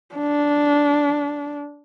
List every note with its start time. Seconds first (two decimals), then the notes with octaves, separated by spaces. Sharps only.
0.15 D4